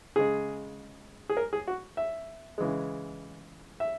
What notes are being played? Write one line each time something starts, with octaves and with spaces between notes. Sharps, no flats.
C#3 G#3 G#4
G#4
A#4
G#4
F#4
E5
C#3 E3 G#3
E5